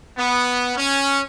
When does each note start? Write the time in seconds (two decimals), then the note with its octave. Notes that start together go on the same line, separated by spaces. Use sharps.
0.17 B3
0.76 C#4